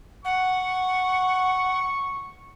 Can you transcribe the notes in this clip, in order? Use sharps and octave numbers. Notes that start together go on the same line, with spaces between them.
F#5 C#6